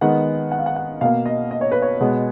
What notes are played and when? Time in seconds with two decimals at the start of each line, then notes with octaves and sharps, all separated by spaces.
0.01 D#3 G#3 B3 F#5
0.51 F#5
0.59 F5
0.66 F#5
0.76 F#5
1.01 B2 A#3 F5
1.26 D#5
1.51 D#5
1.61 C#5
1.72 B4
1.82 C#5
2.00 B2 G#3 B3